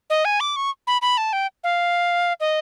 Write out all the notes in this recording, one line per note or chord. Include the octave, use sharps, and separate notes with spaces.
D#5
G#5
D6
C#6
B5
B5
A5
G5
F5
D#5